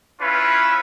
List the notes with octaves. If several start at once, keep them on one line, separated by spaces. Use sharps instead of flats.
C#4 E4 F4 B4